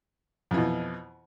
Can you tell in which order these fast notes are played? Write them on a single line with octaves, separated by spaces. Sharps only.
F2 E3 B2